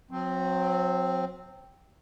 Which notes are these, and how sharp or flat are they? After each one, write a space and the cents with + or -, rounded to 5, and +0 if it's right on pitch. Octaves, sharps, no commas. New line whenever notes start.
F#3 -35 C4 +0